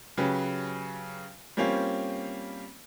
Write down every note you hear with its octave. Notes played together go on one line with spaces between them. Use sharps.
C#3 F#3 G4 B4
G3 A#3 C4 C#4 F4